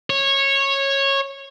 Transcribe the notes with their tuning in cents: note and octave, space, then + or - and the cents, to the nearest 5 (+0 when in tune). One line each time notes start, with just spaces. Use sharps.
C#5 -15